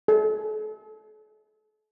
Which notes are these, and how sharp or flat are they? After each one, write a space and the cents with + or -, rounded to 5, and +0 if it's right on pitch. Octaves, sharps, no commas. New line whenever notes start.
A4 -45